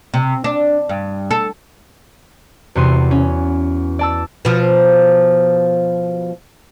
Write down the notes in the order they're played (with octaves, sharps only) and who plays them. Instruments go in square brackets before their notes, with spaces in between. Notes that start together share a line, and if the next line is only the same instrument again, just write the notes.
[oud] C3
D4
G2
A4
[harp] E2 C3 F#4 C6 D#7
C#4
D5 A5 E6
[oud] B2 F3